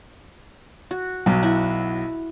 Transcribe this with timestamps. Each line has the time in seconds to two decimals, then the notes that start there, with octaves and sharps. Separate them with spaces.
0.91 F#4
1.26 B1 F#3
1.43 E4 F#4